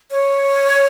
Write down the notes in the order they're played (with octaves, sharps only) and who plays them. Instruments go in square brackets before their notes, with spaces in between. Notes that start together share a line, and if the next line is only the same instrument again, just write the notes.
[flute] C#5